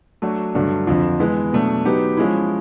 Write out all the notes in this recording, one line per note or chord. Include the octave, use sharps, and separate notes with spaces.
F#3 A3 D4 F#4
G2 D3 F#3 A3
F2 D3 F3
E3 G#3 B3 E4
B2 F#3 A3 D4
F#3 B3 D#4 G4
F3 G#3 C#4 E4